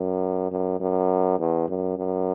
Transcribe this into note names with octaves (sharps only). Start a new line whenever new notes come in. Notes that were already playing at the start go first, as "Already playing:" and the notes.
Already playing: F#2
F#2
F#2
E2
F#2
F#2